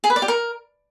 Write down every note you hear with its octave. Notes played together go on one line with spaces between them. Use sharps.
G#4
B4
D5
G4
A#4